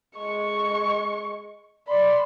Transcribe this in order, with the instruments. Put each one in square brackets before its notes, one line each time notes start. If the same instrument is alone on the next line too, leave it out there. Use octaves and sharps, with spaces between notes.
[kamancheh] G#3 C#6
[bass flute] D5 [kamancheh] B5 C6